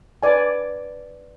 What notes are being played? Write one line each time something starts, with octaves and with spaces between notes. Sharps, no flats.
B4 D5 G#5